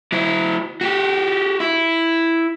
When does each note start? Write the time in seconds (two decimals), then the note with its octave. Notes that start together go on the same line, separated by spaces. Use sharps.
0.12 F#3 E4
0.81 F#4 G4
1.60 E4